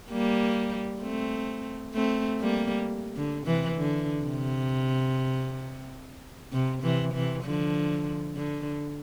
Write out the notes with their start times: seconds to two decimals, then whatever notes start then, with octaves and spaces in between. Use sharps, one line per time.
0.10 G3 A#3
1.02 A3 C4
1.94 A3 C4
2.40 G3 A#3
3.16 D3
3.46 C3 E3
3.77 D3
4.23 C3
6.52 C3
6.83 C3 E3
7.14 C3 E3
7.44 D3 F3
8.36 D3